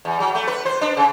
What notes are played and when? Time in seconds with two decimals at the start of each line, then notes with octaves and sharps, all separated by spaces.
0.05 E2
0.20 F#3
0.35 A3
0.47 B4
0.65 C5
0.81 D4
0.97 C#3